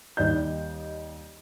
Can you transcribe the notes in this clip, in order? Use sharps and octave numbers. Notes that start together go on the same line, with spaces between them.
D#2 G3 D5 D#5 G6